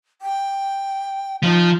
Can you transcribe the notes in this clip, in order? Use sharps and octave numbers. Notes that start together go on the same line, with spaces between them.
G5
F3 D#4